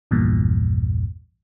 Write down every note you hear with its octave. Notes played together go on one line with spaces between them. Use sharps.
A#1 E2 G2 A#2